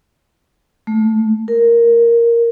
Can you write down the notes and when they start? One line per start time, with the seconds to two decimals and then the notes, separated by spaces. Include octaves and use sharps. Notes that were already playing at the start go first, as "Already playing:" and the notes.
0.87 A3
1.48 A#4